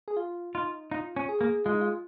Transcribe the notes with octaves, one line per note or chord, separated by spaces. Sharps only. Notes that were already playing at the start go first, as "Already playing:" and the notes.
G#4
F4
D#4 F4
D#4 F4
C#4
G#4
A#3
G#3 F4
D#4
F4